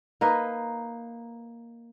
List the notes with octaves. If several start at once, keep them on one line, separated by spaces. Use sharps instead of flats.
A#3 D#4 A#4 B4